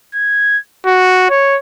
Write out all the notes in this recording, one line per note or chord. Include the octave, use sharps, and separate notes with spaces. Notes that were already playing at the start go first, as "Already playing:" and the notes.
G#6
F#4
C#5